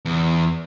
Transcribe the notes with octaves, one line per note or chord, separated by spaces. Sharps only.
E2